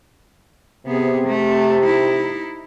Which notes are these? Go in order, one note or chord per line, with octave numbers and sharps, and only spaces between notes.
C3 B3 G#4
A3 C4
D#4 E4